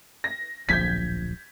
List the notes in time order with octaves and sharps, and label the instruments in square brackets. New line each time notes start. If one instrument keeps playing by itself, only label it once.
[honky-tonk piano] A#6
[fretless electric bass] D1 A#1 F3 [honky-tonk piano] G6 G#6 B6